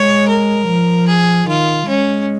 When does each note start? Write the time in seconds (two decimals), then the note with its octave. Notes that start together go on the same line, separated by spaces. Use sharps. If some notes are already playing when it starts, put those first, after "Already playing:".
Already playing: G#3 C#5
0.28 A#4
0.68 F3
1.08 G#4
1.48 D#3 F4
1.88 G#3 C#4